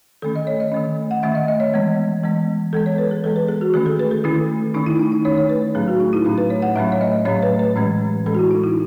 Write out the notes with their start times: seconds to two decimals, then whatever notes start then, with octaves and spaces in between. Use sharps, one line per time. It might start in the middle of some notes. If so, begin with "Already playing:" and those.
0.22 D#3 A3 C#4 A4
0.36 D#5
0.47 C#5
0.60 D#5
0.72 D#3 A3 C#4
1.11 F#5
1.23 D#3 A3 C#4 E5
1.35 D#5
1.48 D#5
1.60 C#5
1.73 E3 G#3 B3
2.23 E3 G#3 B3
2.73 E3 G#3 B3 A4
2.86 C#5
2.98 B4
3.11 G#4
3.24 E3 G#3 B3 A4
3.36 B4
3.49 G#4
3.61 F#4
3.74 D#3 A3 C#4 G#4
3.86 A4
4.00 B4
4.11 A4
4.24 D#3 A3 C#4 E4
4.74 D#3 A3 C#4 D#4
4.86 E4
4.99 D#4
5.12 D#4
5.25 D#3 A3 C#4 C#5
5.38 C#5
5.50 B4
5.75 A2 F#3 A3 C#4 G#4
5.88 F#4
6.00 D#4
6.13 E4
6.25 A2 F#3 A3 C#4
6.38 B4
6.50 C#5
6.62 F#5
6.76 A2 F#3 A3 C#4 E5
6.92 C#5
7.01 D#5
7.25 A2 F#3 A3 C#4 C#5
7.43 B4
7.59 B4
7.76 A2 E3 G#3 C#4
8.26 A2 E3 G#3 C#4 A4
8.35 F#4
8.39 E4
8.51 D#4
8.64 E4